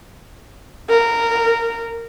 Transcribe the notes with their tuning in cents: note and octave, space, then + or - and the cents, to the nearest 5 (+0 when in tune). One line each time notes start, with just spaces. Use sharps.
A#4 -15